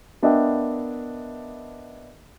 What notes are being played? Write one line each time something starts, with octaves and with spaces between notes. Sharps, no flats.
B3 D4 A#4 D#5 E5 G5